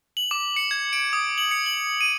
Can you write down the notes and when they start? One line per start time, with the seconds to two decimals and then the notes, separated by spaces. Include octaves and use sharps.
0.17 F#7
0.31 D6
0.56 C#7
0.71 G#6
0.93 D7
1.13 D#6
1.38 F#7
1.51 C#7
1.66 F#7
2.01 D#7